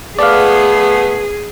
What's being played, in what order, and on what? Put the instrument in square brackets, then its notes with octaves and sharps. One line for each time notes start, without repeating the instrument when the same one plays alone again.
[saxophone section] A3 B3 [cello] G#4 [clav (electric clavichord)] D5 F5